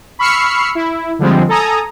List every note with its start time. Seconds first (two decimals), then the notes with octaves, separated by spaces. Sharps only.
0.19 B5 C#6 E6 F6 C7 C#7
0.75 E4
1.19 D3 F3 G3 G#3 C4
1.48 A4 G#5 A#5 D#6